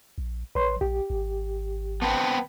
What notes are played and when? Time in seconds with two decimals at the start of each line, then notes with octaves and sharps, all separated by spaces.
0.18 A#1
0.55 A1 B4 C#5 C6
0.81 A#1 G4
1.10 G#1
2.02 B3 C4 B4 A5